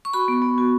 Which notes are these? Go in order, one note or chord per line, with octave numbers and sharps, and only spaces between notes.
C#6
F#4 B5
B3
B3
F#4